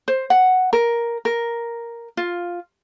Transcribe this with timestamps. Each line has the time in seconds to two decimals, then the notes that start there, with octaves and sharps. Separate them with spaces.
0.08 C5
0.30 F#5
0.73 A#4
1.25 A#4
2.17 F4